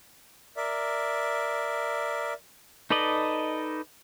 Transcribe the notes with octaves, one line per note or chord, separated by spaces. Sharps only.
A#4 D5 E5
D#4 A4 B4 D5 D#5